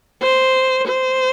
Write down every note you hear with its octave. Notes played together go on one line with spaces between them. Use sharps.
C5
C5